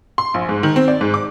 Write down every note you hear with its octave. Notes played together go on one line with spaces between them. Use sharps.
C6
A#1
G#2
D#3
C4
D5
G#2
D6